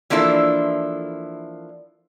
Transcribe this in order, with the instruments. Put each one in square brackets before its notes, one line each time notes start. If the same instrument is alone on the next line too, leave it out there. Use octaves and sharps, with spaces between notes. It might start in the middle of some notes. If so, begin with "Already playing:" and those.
[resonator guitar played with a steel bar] E3 F3 A#3 D4 E4 A4